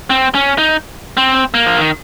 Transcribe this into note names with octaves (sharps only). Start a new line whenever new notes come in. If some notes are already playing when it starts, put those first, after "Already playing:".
C4
C#4
D#4
C4
A#3
F3
D#3